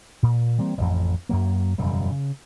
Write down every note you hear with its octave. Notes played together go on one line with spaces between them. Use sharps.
A#2
E3 G3 A#3 C4
A1 F2
F#2 F#3 A#3
E1 F#2 C#3 G3
C#3